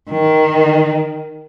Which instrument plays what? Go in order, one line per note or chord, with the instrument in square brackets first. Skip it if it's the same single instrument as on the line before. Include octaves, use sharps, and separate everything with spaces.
[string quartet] D#3